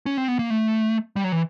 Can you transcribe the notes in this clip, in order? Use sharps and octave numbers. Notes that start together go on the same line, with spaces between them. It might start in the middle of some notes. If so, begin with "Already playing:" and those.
C#4
C4
B3
A#3
A3
G3
F#3
E3